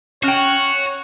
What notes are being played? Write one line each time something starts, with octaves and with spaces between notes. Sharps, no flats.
C#4 F#4 C#5 G5 C#6 F#6 F7